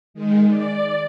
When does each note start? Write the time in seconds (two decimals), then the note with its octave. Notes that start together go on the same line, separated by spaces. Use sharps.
0.14 D#3 G#3
0.48 D5